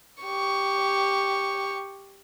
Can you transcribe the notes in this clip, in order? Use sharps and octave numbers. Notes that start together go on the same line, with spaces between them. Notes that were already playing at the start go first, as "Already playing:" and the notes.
G4 C#6